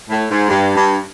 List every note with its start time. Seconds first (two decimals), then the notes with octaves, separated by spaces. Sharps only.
0.09 A2
0.30 G#2
0.48 G2
0.75 G2